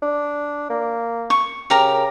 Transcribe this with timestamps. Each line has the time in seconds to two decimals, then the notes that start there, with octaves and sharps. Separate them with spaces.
0.02 D4
0.70 A#3
1.30 C#6
1.70 C#3 G4 A#4 A#5